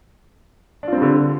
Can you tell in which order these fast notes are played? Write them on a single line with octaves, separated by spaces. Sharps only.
D4 F4 C4 G3 D3